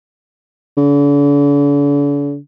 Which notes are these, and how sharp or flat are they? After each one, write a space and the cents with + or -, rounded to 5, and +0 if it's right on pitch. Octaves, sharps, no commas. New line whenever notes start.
D3 -45